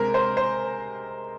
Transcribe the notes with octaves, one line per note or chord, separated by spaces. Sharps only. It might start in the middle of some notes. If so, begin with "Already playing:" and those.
Already playing: C3 G#3 C4 A#4
C5
C5